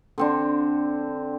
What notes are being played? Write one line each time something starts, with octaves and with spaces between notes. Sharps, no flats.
D3 C4 D4